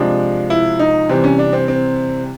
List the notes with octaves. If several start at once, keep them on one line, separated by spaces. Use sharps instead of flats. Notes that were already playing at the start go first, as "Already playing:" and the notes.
Already playing: C3 F3 G#3 D4
E4
D#4
C3 E3 G3 C4
C#4
D4
C4
C4